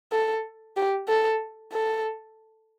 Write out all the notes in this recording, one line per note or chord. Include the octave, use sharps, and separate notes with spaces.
A4
G4
A4
A4